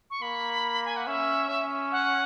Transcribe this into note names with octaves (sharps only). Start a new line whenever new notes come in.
C#6
A#3 B5
G#5
F#5
C#4 E5
C#4
F#5